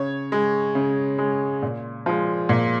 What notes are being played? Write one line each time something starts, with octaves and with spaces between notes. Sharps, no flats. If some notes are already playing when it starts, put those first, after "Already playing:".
Already playing: C#3 C#5
G#3
C#3
G#3
A#2
F3 G#3
A#2